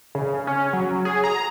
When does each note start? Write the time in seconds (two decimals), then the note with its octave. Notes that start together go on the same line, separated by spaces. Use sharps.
0.15 C#3
0.47 C#4
0.73 F#3
1.05 G#4
1.24 A#5